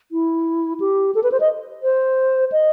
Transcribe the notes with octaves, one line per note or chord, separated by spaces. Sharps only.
E4
G4
A4
B4
C5
D#5
C5
D#5